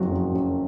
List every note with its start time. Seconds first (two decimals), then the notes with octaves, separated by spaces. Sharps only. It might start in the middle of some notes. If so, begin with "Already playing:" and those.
Already playing: F#1 F2 F#3 F#4
0.10 F#2
0.33 F#2